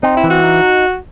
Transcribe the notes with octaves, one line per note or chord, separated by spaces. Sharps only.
C4 D#4
E4
E3
F#4
D#4